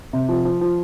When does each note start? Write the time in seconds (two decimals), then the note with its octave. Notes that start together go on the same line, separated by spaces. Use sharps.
0.13 C3
0.29 F3
0.45 F3
0.61 F3